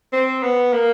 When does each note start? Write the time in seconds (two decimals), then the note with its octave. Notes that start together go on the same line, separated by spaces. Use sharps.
0.13 C4
0.43 B3
0.73 A#3